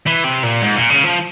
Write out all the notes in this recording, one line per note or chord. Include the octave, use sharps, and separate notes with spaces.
E3
C3
A#2
G#2
A#2
C#3
F3